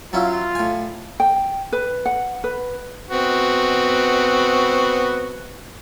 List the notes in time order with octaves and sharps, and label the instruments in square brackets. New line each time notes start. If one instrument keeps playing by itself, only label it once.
[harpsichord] F#3 C#4 E4 [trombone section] F4
[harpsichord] A2 G#5
[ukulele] G5
B4
F#5
B4
[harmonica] B3 C4 F#4